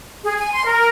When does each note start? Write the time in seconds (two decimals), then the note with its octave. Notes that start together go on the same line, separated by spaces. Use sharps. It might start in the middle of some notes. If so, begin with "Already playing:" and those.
0.24 G#4
0.38 G#5
0.52 C6
0.65 A#4